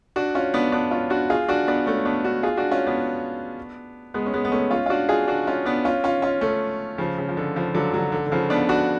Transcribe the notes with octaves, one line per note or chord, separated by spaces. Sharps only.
D4 F#4
C#4 F4
B3 D4
B3 D4
C#4 F4
D4 F#4
F4 G#4
D4 F#4
B3 D4
A3 C#4
B3 D4
D4 F#4
F4 G#4
D4 F#4
C#4 F4
B3 D4
G#3 B3
C#4
G#3 B3
B3
A3 C#4
C#4 F4
F4
D4 F#4
F4 G#4
D4 F#4
C#4 F4
B3 D4
C#4 F4
C#4 F4
C#4 F4
A3 C#4
C#3 F3
C#3
F3
D3
C#3 F3
D3 F#3
D3 F#3
D3
D3
C#3 F3
B3 D4
D4 F#4